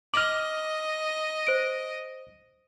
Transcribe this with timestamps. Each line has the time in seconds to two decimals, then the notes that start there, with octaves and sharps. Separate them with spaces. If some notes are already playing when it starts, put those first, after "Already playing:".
0.14 D#5 D6 F6 F#7
1.47 C5 D7